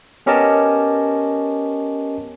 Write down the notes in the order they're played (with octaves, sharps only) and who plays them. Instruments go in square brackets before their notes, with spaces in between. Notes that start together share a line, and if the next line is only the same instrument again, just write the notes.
[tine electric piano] B3 C#4 G4 A#4 D#5 A5